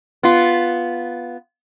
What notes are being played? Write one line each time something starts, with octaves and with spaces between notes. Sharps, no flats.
B3 F4